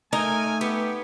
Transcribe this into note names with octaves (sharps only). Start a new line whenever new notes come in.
A3 D#4 A#4 G#5
B3 G4